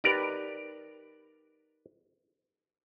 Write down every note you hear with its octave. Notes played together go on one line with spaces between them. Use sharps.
D#4 G4 A#4 B4 D5